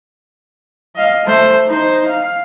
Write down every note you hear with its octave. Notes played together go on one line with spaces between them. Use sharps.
D#5 F5
A3 C5
D#4 C5
F5